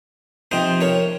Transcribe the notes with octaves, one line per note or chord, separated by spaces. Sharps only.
C3 F3 C4 D#4 C5 D#5
A#4 C#5